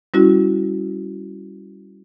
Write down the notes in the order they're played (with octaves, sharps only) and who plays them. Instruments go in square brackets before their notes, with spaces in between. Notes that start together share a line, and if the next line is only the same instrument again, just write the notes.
[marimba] G3 C#4 E4 F#4